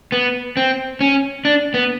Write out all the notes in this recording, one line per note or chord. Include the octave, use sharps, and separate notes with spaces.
B3
C4
C#4
D4
B3